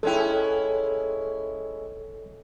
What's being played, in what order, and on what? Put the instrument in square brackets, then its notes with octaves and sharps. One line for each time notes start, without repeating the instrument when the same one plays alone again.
[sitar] G#3 C#4 E4 [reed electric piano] A4 G5